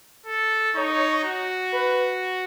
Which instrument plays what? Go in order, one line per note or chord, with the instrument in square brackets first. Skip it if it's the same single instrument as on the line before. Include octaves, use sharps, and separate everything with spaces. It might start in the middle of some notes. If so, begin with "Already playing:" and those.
[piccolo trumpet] A4
[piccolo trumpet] D#4 [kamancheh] C#5
[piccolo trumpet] F#4
[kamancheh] B4